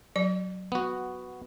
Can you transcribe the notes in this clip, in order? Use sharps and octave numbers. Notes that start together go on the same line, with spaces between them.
F#3 D5
B3 F#4